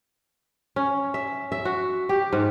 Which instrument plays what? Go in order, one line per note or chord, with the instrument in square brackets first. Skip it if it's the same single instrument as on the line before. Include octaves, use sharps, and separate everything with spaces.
[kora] C#4
E5
E5
F#4
G4
G#2